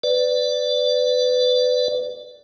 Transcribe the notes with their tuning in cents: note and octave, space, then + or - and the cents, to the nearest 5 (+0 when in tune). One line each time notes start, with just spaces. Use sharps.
B4 +20 D5 +0